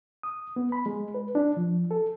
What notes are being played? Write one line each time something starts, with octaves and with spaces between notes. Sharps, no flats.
D#6
B3
B5
G#3
B4
D4
F3
A4